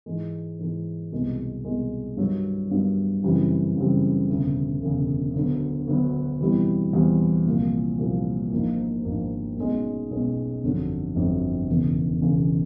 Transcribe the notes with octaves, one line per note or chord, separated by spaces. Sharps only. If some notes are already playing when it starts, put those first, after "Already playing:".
G#2 E3 G#3
G#2 E3 G#3
C2 B2 G#3
C2 B2 G#3
G2 D#3 F#3
G2 D#3 F#3
F#2 C#3 E3 G3 C4
F#2 C#3 E3 G3 C4
E1 D2 C#3
E1 D2 C#3
D2 D3 F#3 B3
D2 D3 F#3 B3
E2 B2 G3 C4 E4
E2 B2 G3 C4 E4
C2 A#2 F3 A#3
C2 A#2 F3 A#3
G#1 G#2 F3 A#3 D4
G#1 G#2 F3 A#3 D4
B1 B2 G#3 C#4
B1 B2 G#3 C#4
G1 F2 D3 F#3
G1 F2 D3 F#3
E1 E2 C#3
E1 E2 C#3